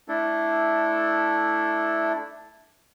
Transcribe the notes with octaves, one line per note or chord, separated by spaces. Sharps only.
A3 D4 E4 A4